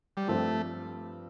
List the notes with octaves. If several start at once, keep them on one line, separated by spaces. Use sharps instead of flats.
G3
G2 F3 A3 C4 G4 C5